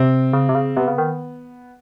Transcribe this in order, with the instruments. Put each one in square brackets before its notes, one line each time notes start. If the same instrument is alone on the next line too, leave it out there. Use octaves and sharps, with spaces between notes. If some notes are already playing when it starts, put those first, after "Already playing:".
Already playing: [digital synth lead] C3 [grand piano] C4
[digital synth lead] C#3
C3
C#3
[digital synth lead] C3 [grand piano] B3
[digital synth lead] C#3
D#3